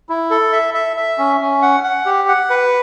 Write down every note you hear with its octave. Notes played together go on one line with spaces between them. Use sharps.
E4
A4
E5
E5
E5
C#4
C#4
F#5
F#5
G4
F#5
B4